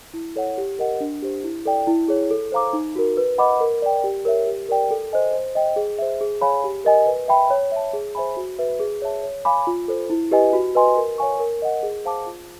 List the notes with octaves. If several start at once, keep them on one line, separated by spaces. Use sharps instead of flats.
E4
A4 C#5 F#5
G4
A#4 D#5 F#5
D4
G4 C5
E4
A4 D5 G5
E4
G#4 C#5
A4
C5 F5 A#5 D6
D#4
F#4 A#4
B4
D#5 F#5 B5 D6
A#4
D5 G5
G4
A#4 C#5 E5
G4
A#4 D5 G5
A4
C5 D#5 G#5
C5
D#5 G5
G#4
C5 E5
G#4
C#5 F5 G#5 B5
G4
A#4 D#5 G#5
B4
E5 G5 B5
C#5
E5 A5
G#4
C5 E5 G#5 B5
F#4
B4 E5
G#4
C#5 E5 A5
C#5
F5 G#5 B5 D6
F4
A4 C5
E4
G4 B4 D#5 G#5
F#4
B4 D#5 G#5 C6
A#4
C#5 F5 G#5 C#6
A#4
D#5 F#5
G#4
C5 F5 A5 D6
F4